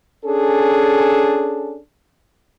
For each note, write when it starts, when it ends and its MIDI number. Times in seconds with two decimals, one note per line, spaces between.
0.25 1.78 61
0.25 1.78 62
0.25 1.78 68
0.25 1.78 69